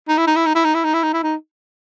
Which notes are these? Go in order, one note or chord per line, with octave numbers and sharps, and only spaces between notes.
D#4
E4
D#4
E4
D#4
E4
D#4
E4
D#4
E4
D#4
E4
D#4